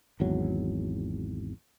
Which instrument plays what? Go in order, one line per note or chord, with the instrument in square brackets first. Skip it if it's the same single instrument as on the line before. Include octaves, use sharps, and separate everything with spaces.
[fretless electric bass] G#1 E2 F#3